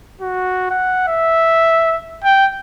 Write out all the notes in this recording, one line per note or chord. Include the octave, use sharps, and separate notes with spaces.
F#4
F#5
E5
G5